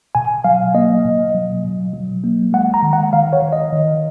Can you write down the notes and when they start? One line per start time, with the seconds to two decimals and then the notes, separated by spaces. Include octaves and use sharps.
0.15 B2 G#5
0.44 F#3 F5
0.74 A#3 D#5
1.05 B2
1.35 F#3
1.64 B2
1.94 F#3
2.24 A#3
2.53 G#3 F#5
2.74 A#5
2.83 D#3
2.93 F#5
3.13 D#3 F5
3.33 C#5
3.42 D#3
3.53 D#5
3.72 D#3